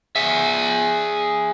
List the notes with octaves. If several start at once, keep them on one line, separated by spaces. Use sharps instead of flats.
G#4 E5